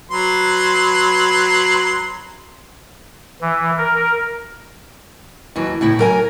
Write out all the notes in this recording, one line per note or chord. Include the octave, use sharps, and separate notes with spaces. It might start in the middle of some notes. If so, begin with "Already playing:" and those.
F#3 B4 C6
E3
A#4
D#2 E3 F#3
A2 C#3 E4
F#3 A#4 G#5